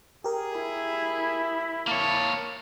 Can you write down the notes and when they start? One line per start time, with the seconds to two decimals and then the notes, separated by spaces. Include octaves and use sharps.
0.24 G4 G#4 A#4
0.56 E4
1.87 A#3 C#5 A5